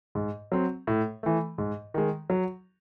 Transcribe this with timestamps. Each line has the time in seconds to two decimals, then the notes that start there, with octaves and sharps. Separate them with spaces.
0.15 G#2
0.52 F#3 C4
0.87 A2
1.23 E3 A3
1.58 G#2
1.94 D#3 G#3
2.30 F#3